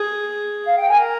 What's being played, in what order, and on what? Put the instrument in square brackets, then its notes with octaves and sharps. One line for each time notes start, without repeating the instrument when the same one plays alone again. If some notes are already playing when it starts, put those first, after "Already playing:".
Already playing: [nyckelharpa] G#4
[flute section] F5
G5
[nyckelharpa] A#4 [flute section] G#5